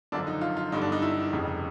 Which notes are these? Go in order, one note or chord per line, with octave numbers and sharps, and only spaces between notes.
G#1 F#2 D3 F3 D4
D#4
F4
F4
G1 G2 D3 D#4
D4
D#4
E4
F1 F2 C#3